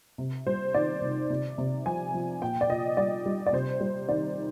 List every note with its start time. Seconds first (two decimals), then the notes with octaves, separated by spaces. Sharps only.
0.18 C3
0.47 G3 C5
0.74 D#3 D5
1.02 C3
1.30 C3
1.58 C3
1.86 F3 G#5
2.14 F3
2.41 A#2 G5
2.61 D5
2.69 A#2 D#5
2.97 G3 D5
3.26 G3
3.46 D5
3.53 C3 C5
3.80 G3
4.09 D#3 D5